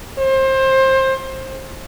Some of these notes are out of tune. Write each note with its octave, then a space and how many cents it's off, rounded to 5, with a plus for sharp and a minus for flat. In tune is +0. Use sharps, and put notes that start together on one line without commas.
C5 +25